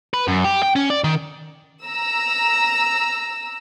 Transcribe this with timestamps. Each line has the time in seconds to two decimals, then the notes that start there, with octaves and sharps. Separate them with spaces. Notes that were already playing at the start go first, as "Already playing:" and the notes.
0.14 B4
0.28 F#2
0.44 G4
0.63 G5
0.76 C#4
0.90 D5
1.04 D#3
1.84 A#5 E6